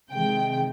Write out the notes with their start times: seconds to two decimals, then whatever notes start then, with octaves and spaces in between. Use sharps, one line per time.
0.10 C3 D#3 G#3 G5